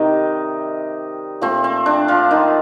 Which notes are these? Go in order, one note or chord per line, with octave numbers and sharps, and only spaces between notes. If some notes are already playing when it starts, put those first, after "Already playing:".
Already playing: C3 D#3 G3 D#4
A#2 F3 A3 C4
C4
D4
F3 F4
D#3 D#4